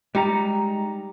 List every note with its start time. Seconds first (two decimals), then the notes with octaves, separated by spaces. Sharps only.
0.15 G3 G#3 D#4 A#5